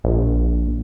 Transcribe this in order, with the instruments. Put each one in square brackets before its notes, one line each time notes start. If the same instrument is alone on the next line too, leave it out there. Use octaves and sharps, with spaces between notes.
[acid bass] A#1